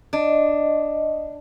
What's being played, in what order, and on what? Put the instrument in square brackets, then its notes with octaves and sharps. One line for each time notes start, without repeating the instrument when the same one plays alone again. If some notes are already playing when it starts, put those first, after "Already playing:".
[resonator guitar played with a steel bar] D4 [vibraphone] D#5